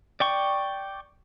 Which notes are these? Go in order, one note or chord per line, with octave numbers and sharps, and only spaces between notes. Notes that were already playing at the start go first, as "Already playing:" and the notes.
D5 G5 C#6